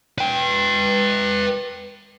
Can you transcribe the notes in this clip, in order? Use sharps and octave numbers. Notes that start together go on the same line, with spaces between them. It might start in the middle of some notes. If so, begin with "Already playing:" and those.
B4 G5